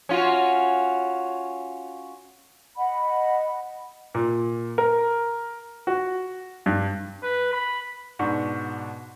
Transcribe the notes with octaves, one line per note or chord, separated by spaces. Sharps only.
C#4 F4 F#4
D#5 F#5 B5
A#2
A#4
F#4
G2
B4
B5
G#2 B2 D4 C#6